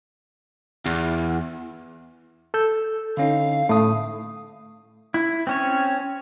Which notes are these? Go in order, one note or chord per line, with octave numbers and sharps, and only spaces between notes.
E2
A4 E6 G6
D3 C#4 D#4 F5
A2 A3 D#6
E4
C4 C#4 C#5